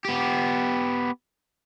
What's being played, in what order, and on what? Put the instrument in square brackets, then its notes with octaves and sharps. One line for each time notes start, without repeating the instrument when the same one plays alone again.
[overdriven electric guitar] B3 G4